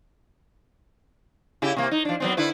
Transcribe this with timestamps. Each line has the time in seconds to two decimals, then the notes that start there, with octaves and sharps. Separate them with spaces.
1.62 C#3 E4 G4
1.76 C3 A#3
1.91 D#4
2.05 F3 D4
2.20 F#3 B3 C4
2.37 D3 E4 B4